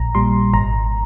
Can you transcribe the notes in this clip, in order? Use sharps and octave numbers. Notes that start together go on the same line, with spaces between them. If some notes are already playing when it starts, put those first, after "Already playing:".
Already playing: A#1 A#5
A#2 G3 C6
G#1 A#5